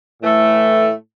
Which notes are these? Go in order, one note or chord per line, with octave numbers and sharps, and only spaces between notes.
A2 E3 A3